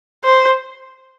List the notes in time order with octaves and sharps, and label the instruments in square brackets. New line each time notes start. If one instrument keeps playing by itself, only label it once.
[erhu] C5